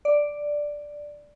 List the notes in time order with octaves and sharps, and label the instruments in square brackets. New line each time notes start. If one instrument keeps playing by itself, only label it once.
[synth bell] D5